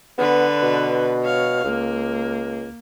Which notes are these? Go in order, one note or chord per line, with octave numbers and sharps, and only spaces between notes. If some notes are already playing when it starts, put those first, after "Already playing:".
D3 B3 B4
B2
C#5 F5
C#2 A#3